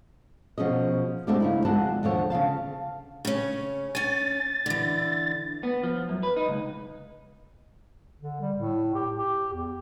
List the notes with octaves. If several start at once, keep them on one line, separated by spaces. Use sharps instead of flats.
B2 F3 C#4 G#4 D#5
G#3 A3 C4 D4 F#4 G4
C#3 D#4 E4
F2 D3 G#3 F#4 F#5 A5
D#2 D3 F3 C#5
C#3 E3 F5 A5
C#3 C#4
C#4 G#5 A6
D3 E3
B3
F3
F#2
B4
D#4
C#2
D3
G3
A2
G4
G4
E2